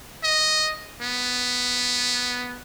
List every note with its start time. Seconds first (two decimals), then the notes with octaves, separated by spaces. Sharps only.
0.23 D#5
1.01 B3